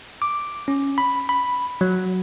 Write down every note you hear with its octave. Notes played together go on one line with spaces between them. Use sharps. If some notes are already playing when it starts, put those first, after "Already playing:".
D6
C#4
B5
B5
F#3